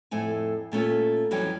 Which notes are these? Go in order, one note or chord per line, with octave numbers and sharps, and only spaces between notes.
F2 A2 A3 G#5
A#2 A3 C#4 F4
F2 E3 F#3 G3 C#4 G5